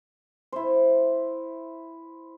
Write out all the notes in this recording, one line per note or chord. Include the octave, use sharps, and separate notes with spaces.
E4 C5